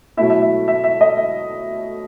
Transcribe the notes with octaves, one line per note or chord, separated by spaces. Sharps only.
B2 F#3 A3 E4 E5
E5
E5
E5
E5
D#5
E5